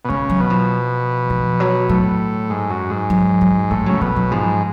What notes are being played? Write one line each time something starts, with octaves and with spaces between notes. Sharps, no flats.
B2
C#3 G#3
F#3
B2
F3
F3
F#3
A2 F#3
G#2
F#2
G#2
F#3
F#3
A2 G#3
C#3 F#3
B2 F#3
F#3
G#2 F3